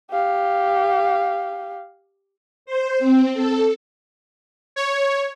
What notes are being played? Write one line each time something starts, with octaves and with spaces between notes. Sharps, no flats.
G4 F5
C5
C4
A4
C#5